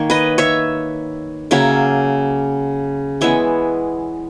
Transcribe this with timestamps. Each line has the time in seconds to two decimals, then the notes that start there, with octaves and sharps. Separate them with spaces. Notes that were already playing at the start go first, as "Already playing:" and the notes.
Already playing: D#3 A#3 C#5
0.10 B4 D#5
0.38 C#5 E5
1.51 C#3 F#3 A#3 C#5 E5
3.21 E3 G#3 B3 C#5 E5